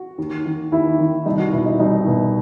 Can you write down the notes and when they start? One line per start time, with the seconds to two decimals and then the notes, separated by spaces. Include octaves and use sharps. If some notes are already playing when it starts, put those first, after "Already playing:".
Already playing: F#4
0.18 D#2
0.45 D#3
0.72 D#2 E4
0.99 D#3
1.26 C2 D#4
1.39 F#4
1.52 B2 E4
1.66 D#4
1.80 C2 D#4
2.06 B2